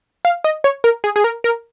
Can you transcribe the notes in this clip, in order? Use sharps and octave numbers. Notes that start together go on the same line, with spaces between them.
F5
D#5
C#5
A#4
G#4
G#4
A#4
A#4